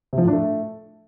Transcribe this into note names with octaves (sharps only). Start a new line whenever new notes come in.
C3
F3
A2
D4
A3